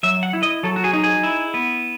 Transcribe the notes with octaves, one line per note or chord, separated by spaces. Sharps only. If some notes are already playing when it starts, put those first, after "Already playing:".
F#3 E5
F#5
E4
D#5
F#3 A4
F#4
G#4
D#4
G#4
E4
B3